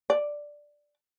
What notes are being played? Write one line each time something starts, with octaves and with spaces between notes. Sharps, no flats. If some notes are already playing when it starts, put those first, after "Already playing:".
D5